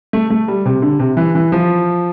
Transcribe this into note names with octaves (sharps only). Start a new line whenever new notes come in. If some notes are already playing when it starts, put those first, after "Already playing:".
A3
A3
G3
C3
D3
C3
E3
E3
F3